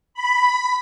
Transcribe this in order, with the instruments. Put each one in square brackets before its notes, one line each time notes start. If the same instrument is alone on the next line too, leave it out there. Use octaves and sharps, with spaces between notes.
[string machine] B5